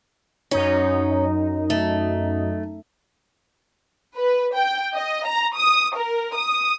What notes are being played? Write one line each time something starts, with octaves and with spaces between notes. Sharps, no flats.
F#2 C#4 D#4
A3
B4
G5
D#5
A#5
D#6
A#4
D#6